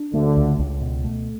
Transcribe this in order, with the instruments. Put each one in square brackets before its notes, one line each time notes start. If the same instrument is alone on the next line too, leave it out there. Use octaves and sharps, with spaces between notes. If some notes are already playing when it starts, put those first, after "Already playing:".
Already playing: [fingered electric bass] D4
[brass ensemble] D2 D3 [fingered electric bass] A3
[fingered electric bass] C#2
C#2
B2
A3